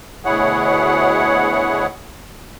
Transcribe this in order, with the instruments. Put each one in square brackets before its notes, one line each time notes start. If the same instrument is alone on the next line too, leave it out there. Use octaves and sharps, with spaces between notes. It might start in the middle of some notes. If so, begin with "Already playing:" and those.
[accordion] D2 B2 E4 G#4 C#5 F#5